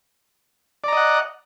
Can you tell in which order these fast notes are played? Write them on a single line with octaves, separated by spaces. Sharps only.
D5 A#5 D#5 F#5